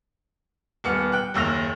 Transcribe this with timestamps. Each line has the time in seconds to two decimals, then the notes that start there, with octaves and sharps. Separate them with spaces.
0.84 D#1 B3 F6 C#7
1.12 G5 F#6
1.34 F#1 D#2 E6 A#6 F7